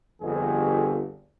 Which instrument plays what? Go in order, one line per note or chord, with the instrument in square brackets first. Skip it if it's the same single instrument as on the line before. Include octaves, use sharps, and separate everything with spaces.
[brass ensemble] G1 F2 [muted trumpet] G#4